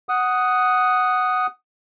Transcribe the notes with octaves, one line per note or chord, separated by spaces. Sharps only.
F#5 D#6